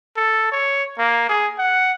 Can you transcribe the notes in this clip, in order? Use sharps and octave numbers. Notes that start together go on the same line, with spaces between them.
A4
C#5
A#3
G#4
F#5